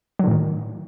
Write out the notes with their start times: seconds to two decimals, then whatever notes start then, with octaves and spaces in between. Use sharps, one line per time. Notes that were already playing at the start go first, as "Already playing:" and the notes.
0.19 F#3
0.23 D3
0.27 A2
0.31 D#3